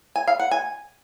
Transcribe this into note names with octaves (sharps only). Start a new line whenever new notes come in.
G#5
F5
F#5
G#5